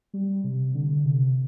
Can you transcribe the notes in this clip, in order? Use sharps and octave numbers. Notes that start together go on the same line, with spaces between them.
G3
C3
D3
C3